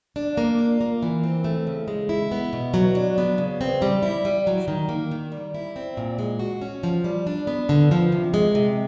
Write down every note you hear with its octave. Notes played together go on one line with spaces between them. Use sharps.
D4
A#3
F4
A#3
E3
C4
A3
C#3
G#3
E4
B3
B2
F#3
D4
B3
C#3
C4
G3
E4
G3
F#3
D#3
A#3
D#3
G3
E4
C4
A#2
G#3
F#4
C#4
F3
G3
D4
B3
D3
F3
C3
G#3
C3